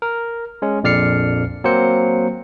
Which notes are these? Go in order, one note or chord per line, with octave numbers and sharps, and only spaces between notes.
A#4
G#3 C#4
A#1 F2 D5 F6 C7 C#7
F#3 A#3 C4 C5 C#7